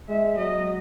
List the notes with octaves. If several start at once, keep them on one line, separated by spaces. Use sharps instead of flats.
G#3 E5
F#3 D#5